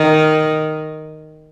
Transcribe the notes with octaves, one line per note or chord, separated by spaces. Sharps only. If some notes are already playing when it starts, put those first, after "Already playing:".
Already playing: D#3